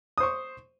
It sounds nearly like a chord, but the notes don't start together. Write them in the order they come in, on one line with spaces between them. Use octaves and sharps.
D#6 C5 C#6